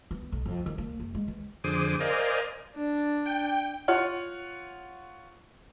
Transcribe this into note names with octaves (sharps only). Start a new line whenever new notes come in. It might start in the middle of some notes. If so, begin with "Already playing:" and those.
B3
B1
F2
D#3
A#3
F#1
G#3
E3
F2 D3 G#4 C5 D6 D#6
A#4 C5 D5 D#5 F5 G#5
D4
G5
F4 C#5 F#5 F6